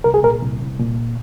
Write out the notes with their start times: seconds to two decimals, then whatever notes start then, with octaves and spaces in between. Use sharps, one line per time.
0.04 C2 A#4
0.14 G#4
0.23 A#2 A#4
0.43 C2
0.61 C2
0.80 A#2